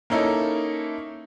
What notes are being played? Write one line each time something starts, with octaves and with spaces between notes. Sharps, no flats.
A#3 C#4 D#4 E4 A4